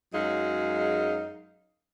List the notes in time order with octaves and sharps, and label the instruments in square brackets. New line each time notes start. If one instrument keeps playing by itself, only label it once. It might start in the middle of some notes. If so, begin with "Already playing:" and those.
[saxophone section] F#2 F#3 G#3 D#4 G#4 F5